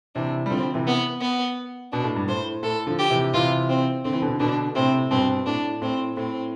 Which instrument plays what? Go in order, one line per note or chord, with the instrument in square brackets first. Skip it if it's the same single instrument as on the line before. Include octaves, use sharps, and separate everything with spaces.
[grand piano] C3 E3 [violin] D4
[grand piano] G3
[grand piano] D3 F3 [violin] C4
[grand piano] C3 E3
[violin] B3
B3
[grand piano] B2 [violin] D4
[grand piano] A2
G2
[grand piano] A2 [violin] C5
[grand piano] A2 [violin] A4
[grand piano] D3 F3
[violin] G4
[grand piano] C3 E3
[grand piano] C3 E3 [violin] F4
[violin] C4
[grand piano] D3 [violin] C4
[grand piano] E3
B2 D3
[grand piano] B2 D3 [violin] D4
[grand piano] A2 C3 [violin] C4
[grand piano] G2 B2 [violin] C4
[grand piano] A2 [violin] D4
[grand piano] A2 [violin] C4
[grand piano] A2 [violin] C4